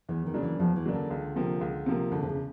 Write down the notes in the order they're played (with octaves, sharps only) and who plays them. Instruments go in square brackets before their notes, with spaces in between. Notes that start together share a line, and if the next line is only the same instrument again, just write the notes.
[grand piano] E2 [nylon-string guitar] E3
[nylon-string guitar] D#3
[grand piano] C#3 F#3 A#3 D4
[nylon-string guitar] E3
[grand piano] E2 [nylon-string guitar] F3
[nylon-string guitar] E3
[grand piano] C#3 F#3 A#3 D4
[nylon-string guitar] D3
[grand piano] C#2
C3 F3 A#3
C#2
C3 F3 A#3
[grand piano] E1 [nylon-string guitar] D3
[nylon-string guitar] C3
C#3